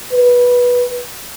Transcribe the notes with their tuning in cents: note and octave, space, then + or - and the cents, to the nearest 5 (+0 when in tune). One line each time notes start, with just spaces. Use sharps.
B4 -15